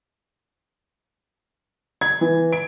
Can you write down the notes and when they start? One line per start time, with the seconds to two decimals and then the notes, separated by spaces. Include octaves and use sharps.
2.01 G#6
2.21 E3
2.53 D7